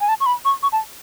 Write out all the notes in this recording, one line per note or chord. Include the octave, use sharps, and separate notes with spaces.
G#5
A5
C#6
B5
C#6
C#6
A5